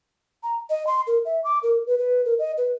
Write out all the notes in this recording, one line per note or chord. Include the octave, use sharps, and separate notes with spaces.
A#5
D#5
C6
A#4
E5
D6
A#4
B4
B4
A#4
D#5
B4